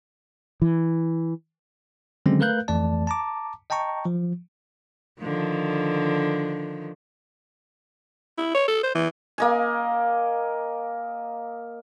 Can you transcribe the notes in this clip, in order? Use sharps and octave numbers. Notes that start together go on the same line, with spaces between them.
E3
D3 D#3 F#3 G#3 C4 C#4
A3 A#4 B4 F5 F#6 G6
F2 E3 A3 D5 A5
A5 A#5 D6
D#5 G5 A5 A#5 C#6
F3
D3 D#3 F3
E4
C#5
A4
C5
E3
A#3 D#5 G#5